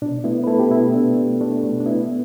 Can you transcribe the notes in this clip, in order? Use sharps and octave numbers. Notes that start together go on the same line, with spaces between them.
B2 D4
A3 B3 E4
B4
A3 E4 A4
G4
B2 B3 E4
B2 D4
A3
A3 D4
B2
D4
B2 B3 E4
A3